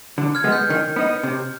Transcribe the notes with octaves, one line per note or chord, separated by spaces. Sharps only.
D3
F6 G#6
G#3 B3
G6
D#3
B3 D#4
C3